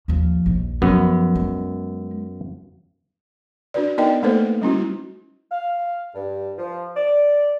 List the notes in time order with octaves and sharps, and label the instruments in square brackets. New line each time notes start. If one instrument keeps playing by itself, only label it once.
[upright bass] D#2 F3
A#1 D#2
[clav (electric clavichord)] F#2 B3 [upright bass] F3
[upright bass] G#3
[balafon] D4 F#4 B4 D5
B3 D#4 A#4 D5 D#5 G5
A3 A#3 D#4 A4 B4 C5
G3 C#4 E4 F#4
[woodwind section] F5
G2
F3
D5